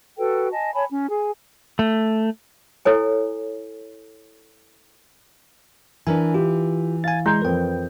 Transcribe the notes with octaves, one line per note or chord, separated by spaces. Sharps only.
F#4 A4 B4 G5
D#5 G#5 A5
C#5 G#5 A5 B5
C#4
G#4 G#5
A3
E4 A4 C#5 G#5
E3 D4 A#4 G#5
F4 G4
F5 G#5 A6
G#3 E4 A#5 C6 G6
F2 A#4 B4 G5